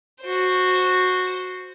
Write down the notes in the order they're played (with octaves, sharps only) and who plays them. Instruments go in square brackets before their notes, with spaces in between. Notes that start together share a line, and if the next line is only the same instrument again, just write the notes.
[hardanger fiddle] F#4 C5